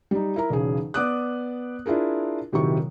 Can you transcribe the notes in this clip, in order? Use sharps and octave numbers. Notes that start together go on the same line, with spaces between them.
G3 D#4
E4 A#4 A#5
E1 B1 C#3 G#4
B3 D5 D6 D#6 F#6
D4 E4 F4 G#4 A#4
D#1 C3 D#3 F#3 E4 C#6